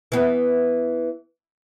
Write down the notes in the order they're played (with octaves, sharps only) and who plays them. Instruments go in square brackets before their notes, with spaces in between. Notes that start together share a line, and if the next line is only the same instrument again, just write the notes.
[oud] E3 B3